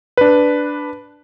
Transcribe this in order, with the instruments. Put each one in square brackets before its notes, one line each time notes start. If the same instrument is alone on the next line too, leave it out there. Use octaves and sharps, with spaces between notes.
[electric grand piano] D4 B4